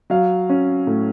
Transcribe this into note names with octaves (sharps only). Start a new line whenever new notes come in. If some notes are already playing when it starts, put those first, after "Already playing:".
F#3 F5
C#4
A2